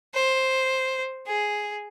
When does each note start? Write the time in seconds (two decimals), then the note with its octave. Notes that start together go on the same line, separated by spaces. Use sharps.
0.14 C5
1.27 G#4